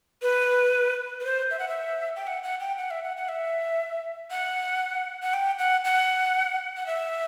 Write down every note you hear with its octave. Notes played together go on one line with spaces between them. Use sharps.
B4
B4
C5
E5
F#5
E5
G5
F#5
F#5
G5
F#5
E5
F#5
F#5
E5
F#5
F#5
G5
F#5
F#5
F#5
E5